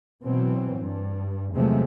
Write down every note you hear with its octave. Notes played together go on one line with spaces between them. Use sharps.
B2 E3 F#3 C4
G2
E2 C3 F3 F#3 G#3 A3